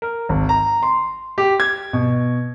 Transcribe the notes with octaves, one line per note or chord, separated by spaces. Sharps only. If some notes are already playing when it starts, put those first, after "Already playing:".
A#4
G#1
A#5
C6
G4
G#6
B2